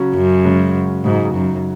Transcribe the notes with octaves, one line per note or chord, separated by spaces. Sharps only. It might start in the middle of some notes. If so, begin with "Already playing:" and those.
Already playing: C#3 F#3 C#4 F#4
F#2
C#3 G#3 C#4 F#4
G#2 C#3 F#3 D#4 F#4
F#2